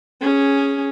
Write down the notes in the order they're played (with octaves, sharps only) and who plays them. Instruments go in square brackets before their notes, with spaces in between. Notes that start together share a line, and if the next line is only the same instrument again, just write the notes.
[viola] C#4 G#4